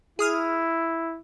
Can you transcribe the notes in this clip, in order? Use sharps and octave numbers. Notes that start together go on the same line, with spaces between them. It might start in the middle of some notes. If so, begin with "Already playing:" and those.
E4 G#4 D#6 F6